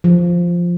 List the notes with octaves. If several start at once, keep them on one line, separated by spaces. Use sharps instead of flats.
F3